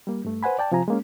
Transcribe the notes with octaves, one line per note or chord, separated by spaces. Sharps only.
G3 A#3
G2 A3
B4 C5 F#5 G#5 B5
D5 G5 A5
C3 F3 F4 G#5 A#5
G#3 A#3 C#4